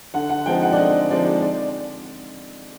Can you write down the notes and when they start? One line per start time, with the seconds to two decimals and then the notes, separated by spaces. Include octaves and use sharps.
0.14 D3 F#5
0.29 F#5
0.46 F3 G#3 C4 D#4 G5
0.62 F#5
0.72 D5
0.78 D3 D#5
1.10 F3 G#3 C4 D#4 D5
1.42 D5